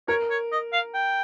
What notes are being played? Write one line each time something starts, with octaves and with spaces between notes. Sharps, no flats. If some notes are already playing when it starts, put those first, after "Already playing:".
A#4 C#5
C#5
D#5
F5
G5